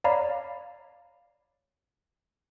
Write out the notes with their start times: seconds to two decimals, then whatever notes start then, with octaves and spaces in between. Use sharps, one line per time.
0.04 C#5 D5 F5 A#5 B5